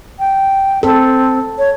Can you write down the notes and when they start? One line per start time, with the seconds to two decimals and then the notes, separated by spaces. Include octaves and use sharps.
0.19 G5
0.83 C4 A4
1.58 C#5